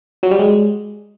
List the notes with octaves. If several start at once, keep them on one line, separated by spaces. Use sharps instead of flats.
F#3
G3
G#3